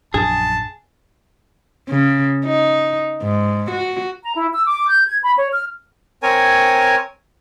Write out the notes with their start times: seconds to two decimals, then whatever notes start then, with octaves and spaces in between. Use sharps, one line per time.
0.14 A#1 F#2 D4 G#4 A5
1.89 C#3
2.45 D#4
3.22 G#2
3.71 F#4
4.22 A#5
4.35 E4
4.54 E6
4.66 D6
4.89 G6
5.07 G#6
5.23 B5
5.37 C#5
5.52 F6
6.23 C4 A#4 C#5 G#5